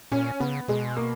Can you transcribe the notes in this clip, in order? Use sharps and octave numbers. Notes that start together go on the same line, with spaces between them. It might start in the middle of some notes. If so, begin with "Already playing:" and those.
A#2 C#4
C#3 B3
B2 G#3
A#3